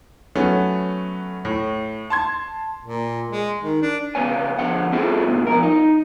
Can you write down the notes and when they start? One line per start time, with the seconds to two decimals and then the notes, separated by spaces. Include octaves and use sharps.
0.35 F#3 A3 B3 C#4
1.45 A2
2.10 A5 C6 G#6
2.84 A#2
3.30 G#3
3.62 D#3
3.82 D4
4.15 C#2 C#3 F#3 B3 C#5 G#5
4.59 D3 F3 F#5
4.92 C4 E4 F4 G#4 A4
5.26 G#2 B2 D3
5.47 F3 A#4
5.63 D#4